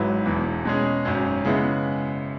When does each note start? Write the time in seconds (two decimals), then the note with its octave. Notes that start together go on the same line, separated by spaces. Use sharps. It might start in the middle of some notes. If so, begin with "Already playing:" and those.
Already playing: G#1 G#2 F#3 E4 B4
0.26 E1 E2 E3
0.65 B2 G#3 C#4 G#4
1.05 G#1 F#2 F#3 C#4
1.45 C#3 G#3 B3 E4